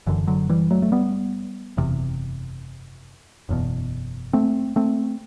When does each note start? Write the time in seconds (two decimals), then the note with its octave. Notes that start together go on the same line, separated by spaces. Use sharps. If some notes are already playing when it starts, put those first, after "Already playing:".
0.06 F#1 F#2 D3 E3
0.27 D3 F#3
0.49 E3 G3
0.71 F#3 A3
0.82 A3
0.92 G3 B3
1.77 F#1 E2 C3
3.49 F#1 E2 B2
4.33 A3 C4
4.76 A3 C4